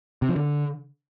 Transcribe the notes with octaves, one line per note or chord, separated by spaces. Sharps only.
C3
F3
D3